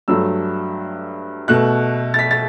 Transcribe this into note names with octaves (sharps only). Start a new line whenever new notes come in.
G2 F#3 A3 E6
B2 A3 F#6
A6
B6
A6